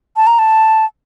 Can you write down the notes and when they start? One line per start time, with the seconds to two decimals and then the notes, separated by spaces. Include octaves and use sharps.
0.17 A5
0.27 A#5
0.39 A5